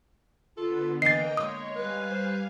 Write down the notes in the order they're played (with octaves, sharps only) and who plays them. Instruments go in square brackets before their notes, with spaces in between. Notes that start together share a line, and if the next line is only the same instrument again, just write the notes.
[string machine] D3 B3 [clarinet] F4 [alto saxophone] A4
[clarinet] E3 [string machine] A#3 A#4 G5 [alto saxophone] D#5 [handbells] A6 C7
[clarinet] G#3 [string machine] C#5 [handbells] D#6
[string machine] G3 F5 G#5 [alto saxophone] B4
[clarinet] C5